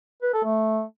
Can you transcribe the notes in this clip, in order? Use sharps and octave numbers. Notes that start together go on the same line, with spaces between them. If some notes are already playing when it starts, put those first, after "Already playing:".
B4
A4
A3